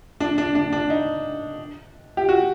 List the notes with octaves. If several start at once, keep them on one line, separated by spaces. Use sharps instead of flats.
D4
D4
D4
D4
D#4
G4
F#4